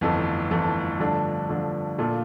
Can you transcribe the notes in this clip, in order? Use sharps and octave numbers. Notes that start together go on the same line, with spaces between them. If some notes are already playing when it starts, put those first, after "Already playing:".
G1 F2 E3 A3
G1 F2 E3 A3
G2 D3 F3 A3 D4
G2 D3 F3 A3 D4
A#2 A3 D4 F4